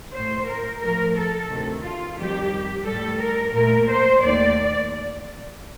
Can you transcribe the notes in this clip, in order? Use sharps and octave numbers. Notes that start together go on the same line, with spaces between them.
A2 A3 C5
A#4
A2 F3 A3 A#4
A4
D2 C3 D#3
F4
F2 D#3 G3 G4
A2 G3 A4
A#4
A#2 A3 A#4
C5
D#2 D#3 A3 D5